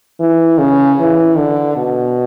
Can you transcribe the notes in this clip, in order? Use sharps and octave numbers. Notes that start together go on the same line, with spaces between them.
E3
C#3
E3
D3
B2